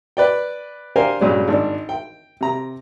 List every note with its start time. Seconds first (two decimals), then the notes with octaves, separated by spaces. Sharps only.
0.17 B4 D5 G5
0.96 D4 G4 A#4 C5 F5 G#5
1.21 G2 A#2 C#3 F#3 G#3 D4
1.48 G#1 D4
1.89 G5
2.41 C3 A#5